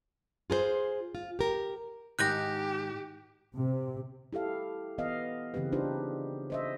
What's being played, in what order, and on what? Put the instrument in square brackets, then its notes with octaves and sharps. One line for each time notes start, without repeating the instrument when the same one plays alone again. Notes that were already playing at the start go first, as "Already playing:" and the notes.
[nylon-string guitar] F4 G#4 A#4 C5
F4
G4 A#4
[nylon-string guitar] G#2 D#3 [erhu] G4 [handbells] F#6 G6 A#6
[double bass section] C3
[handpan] E4 G4 A4 F5
E3 B3 B4 D#5 F5
C#3 E3 C4 G4 B4
D4 D#4 F4 G4 B4 C5
C5 D#5 E5